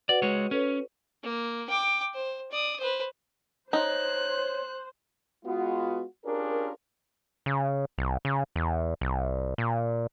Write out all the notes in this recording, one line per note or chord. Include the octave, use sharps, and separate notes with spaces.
F#4 B4 D5 F#5
G#3 C#5
C#4 A4 B4 C#5
A#3
G5 D6
C5
D5 D#6
B4 C5
D#4 C5 C#5 F#6
G#3 B3 F4 F#4
C#4 D4 F4 G4 G#4 A#4
C#3
C2
C#3
E2
C2
A#2